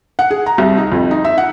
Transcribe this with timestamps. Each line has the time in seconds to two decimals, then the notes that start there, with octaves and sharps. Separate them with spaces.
0.19 F#5
0.31 G#4
0.46 A#5
0.58 C2
0.77 D#4
0.92 F2
1.11 D#4
1.25 E5
1.38 F#5